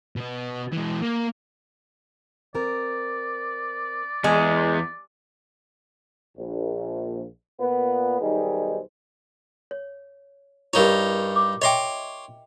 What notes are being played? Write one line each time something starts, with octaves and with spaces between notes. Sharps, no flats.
B2 B3
E3 G#3
A#3
C4 A#4 D5
E2 G#3 G#5
A#1
A#2 B3 B4
B1 D#3 G3 D#4 G#4 C5
C#5
G2 D#4 E4 G4 A#4 C#5
D6
C#5 D#5 E5 G5 C6 D6